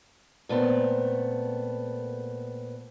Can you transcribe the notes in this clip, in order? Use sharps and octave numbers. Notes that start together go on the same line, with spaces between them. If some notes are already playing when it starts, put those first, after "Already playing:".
A#2 A3 B3 C4